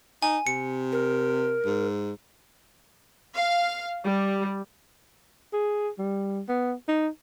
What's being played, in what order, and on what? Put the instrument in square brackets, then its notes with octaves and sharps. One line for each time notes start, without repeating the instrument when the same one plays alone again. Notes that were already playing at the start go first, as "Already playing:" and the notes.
[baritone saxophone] D#4 [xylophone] G#5
[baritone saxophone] C3 [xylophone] C#7
[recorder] A#4
[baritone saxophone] G#2
[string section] F5
G3
[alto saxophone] G#4
G3
B3
D#4